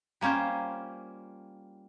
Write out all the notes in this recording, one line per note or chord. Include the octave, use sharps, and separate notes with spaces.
G3 A#3 C#4 F4 C5